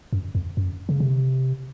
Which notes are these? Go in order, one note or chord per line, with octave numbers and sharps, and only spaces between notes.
F#2
F2
F#2
C#3
C3